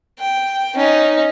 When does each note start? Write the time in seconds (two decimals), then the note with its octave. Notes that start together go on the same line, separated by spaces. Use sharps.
0.19 G5
0.76 C#4 D#4